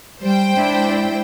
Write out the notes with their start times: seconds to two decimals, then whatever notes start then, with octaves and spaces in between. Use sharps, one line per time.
0.22 G3 C5 G5
0.57 G#3 D4 E4